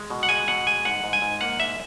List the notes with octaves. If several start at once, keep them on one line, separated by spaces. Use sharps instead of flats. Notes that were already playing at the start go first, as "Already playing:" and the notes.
Already playing: G#3
B2
F#5
G#3 G#5
B2 F#5
G#3 G#5
G#2 F#5
G#2
G#5
G#2
A#3 F#5
G#2 E5